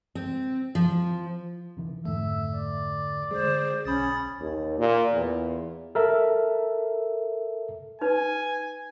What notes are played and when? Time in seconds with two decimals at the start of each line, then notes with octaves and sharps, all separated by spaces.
0.15 C4
0.75 F3
1.77 C3 D#3 E3
2.05 F2 G#2 D3 A3 E5
2.55 D5
3.31 D3 G#3 G#4 C5
3.85 B1 C#4 B5 D#6 A6
4.41 D#2
4.79 A#2
5.13 E2
5.95 A4 A#4 E5
8.01 D#4 B4 G#5